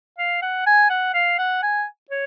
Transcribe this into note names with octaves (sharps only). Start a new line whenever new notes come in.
F5
F#5
G#5
F#5
F5
F#5
G#5
C#5